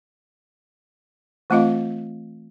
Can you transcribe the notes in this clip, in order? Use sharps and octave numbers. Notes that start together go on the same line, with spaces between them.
E3 A3 C4 F4 D#5 F5